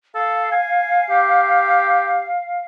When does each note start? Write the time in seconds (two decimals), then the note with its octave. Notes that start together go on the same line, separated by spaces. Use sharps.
0.15 A4 F5
0.52 G#5
1.10 G4